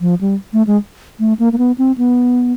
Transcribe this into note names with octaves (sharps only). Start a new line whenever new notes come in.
F3
G3
A3
G#3
A3
A#3
A#3
B3
C4
B3